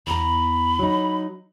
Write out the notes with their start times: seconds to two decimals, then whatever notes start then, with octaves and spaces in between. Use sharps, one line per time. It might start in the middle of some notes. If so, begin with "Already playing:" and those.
0.07 E2 A#5 B5
0.79 F#3 D#4